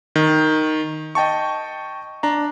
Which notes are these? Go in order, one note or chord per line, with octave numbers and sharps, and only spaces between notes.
D#3
D#5 G5 A5 C#6
D4 A#5